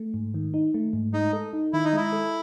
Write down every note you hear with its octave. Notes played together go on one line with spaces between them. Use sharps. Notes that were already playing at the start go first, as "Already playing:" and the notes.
Already playing: A3
G#2
D#3
D#4
A3
G#2
G#3 D#4
A4
D#4
D#3 E4
D#4
G#3 E4
A4